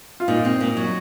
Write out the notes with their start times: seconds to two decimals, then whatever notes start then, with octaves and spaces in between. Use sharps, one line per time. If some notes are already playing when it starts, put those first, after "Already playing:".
0.20 F4
0.28 A#2 D#4
0.45 C4
0.60 A#2
0.77 F#3